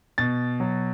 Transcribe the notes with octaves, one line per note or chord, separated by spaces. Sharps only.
B2 A6
F#3